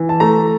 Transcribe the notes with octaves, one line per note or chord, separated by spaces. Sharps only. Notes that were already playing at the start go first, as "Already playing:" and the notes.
Already playing: E3
A5
A3 A#5